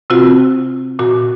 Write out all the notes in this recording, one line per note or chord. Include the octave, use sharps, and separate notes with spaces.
C3 C4 F4 F#4
A#2 F#4